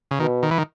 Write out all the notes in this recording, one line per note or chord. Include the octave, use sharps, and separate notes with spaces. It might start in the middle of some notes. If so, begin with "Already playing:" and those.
C#3
B2 D#3
D#3
E3
D#3